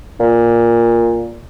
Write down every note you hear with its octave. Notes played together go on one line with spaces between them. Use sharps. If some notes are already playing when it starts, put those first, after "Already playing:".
A#2